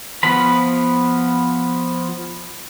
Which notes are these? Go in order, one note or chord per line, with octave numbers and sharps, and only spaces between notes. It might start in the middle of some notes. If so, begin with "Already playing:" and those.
F3 B3 B4 B5